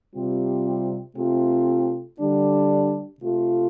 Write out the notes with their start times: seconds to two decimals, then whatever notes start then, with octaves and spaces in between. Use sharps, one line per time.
0.15 C3 G3 C4 F4
1.16 C3 A3 C4 F4
2.19 D3 G3 D4
3.21 C3 A3 F4